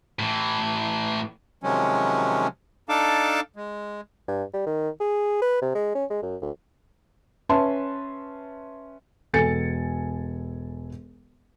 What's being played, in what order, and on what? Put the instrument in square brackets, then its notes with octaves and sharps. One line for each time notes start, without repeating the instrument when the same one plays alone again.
[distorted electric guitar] A2 E3
[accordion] C3 D#3 F3 F#3 G#3 C#4
D4 D#4 A4 F5 A5 D6
G#3
[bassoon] G2
G3
D#3
G#4
B4
C3
G#3
C#4
G#3
F#2
D2
[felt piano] C#4 B4 E5 A5 C6
E1 A4 G#5 A6 C#7